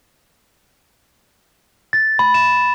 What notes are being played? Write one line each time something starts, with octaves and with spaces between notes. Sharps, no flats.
A6
B5
E7